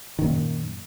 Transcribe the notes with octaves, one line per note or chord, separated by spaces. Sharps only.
F#2 A#2 D#3